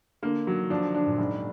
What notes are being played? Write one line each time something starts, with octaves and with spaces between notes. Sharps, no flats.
D3 A#3
D#3 F#3
D#3
F3 D4
D#3
D3 D4
A#2
F#1 G#2